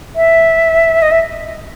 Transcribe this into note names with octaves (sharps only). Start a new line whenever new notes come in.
E5
D#5
E5